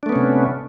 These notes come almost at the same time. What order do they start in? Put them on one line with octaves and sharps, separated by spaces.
D4 A3 B3 C#4 C3